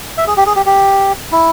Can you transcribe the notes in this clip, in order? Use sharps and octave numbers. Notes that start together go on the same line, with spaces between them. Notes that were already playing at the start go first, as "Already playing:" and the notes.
E5
G#4
G4
G#4
G4
G4
E4